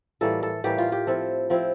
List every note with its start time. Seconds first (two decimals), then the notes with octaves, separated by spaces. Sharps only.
0.21 A2 E3 G3 A#3 A4
0.43 A4
0.64 A2 E3 G3 A#3 G4
0.78 F4
0.92 G4
1.07 F3 C4 E4 A4
1.50 F3 C4 E4